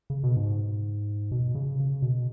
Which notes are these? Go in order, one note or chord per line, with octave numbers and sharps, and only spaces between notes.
C#3
B2
G#2
B2
C#3
C#3
B2